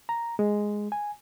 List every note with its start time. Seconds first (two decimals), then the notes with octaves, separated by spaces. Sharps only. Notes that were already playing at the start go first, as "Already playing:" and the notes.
0.09 A#5
0.39 G#3
0.92 G#5